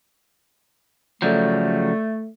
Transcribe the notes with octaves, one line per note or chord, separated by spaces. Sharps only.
C#3 F3 F#3 A3 A4 D5 G6